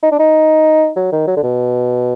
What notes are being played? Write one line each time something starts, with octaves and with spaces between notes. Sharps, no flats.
D#4
D4
D#4
F#3
D#3
F#3
D3
B2